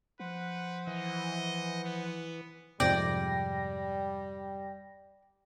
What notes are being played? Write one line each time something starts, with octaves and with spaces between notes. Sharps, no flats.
F3 B4 C5 F#5
E3 D#5
B3
F2 G#2 C3 G3 D5 G5 A#6